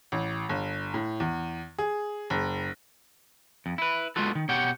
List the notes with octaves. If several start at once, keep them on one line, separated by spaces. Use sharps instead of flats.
A1
G1
A2
E2
G#4
F#1
F2
E4 B4
G#3 B3 F4 F#4 A4
D#3
B2 G4 C#5 F#5 G5